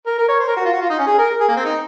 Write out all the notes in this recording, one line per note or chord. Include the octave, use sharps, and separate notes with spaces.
A#4
A#4
C#5
C5
A#4
F#4
F4
F#4
F4
D#4
C#4
G#4
A#4
G#4
A#3
C4
D#4